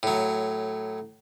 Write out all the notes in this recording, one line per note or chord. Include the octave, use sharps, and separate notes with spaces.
A2 F#3